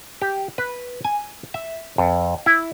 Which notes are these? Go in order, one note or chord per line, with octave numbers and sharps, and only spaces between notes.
G4
B4
G#5
E5
F2
E4